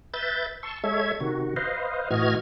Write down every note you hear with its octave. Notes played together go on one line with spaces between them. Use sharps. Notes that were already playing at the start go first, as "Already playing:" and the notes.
B4 E5 G6 A6
A5 C6 C#6 E6
G#3 A4 C#5 E5 G#6
C3 D#3 F#4
B4 C5 D#5 F5
A2 E3 F#4 D#5 F6 G#6